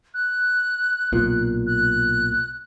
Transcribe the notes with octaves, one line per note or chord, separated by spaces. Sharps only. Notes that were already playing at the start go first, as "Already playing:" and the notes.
F#6
B1 A#2
F#6